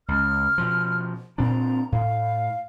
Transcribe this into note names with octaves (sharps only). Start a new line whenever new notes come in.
C#2 F6
B2 F3
A#2 C4 D4 A#5
A2 F5